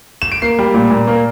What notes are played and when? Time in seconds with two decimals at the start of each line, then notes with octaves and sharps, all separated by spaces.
0.22 E7
0.32 D7
0.42 A#3 C7
0.59 G3
0.74 A#2
0.90 A#2
1.07 A#3